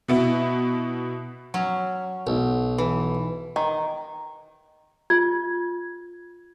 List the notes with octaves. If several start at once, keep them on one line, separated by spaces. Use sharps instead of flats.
B2 B3 E4
F#3 C#4
B1
E3
D#3
F4 G#6